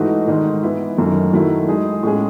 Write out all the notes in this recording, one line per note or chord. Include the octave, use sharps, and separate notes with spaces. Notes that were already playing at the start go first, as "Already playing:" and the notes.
Already playing: G#2 E3 A3 D#4 F#4
G#2 D#3 G#3 D#4
E3 B3 E4
F#2 D#3 F#3 A3
D#3 F#3 A3 E4
G#3 D#4 G#4
A2 G#3 C#4 G#4